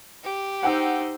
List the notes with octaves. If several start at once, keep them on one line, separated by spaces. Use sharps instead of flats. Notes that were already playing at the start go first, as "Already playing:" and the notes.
G4
D#4 C5 F#5 G5 E6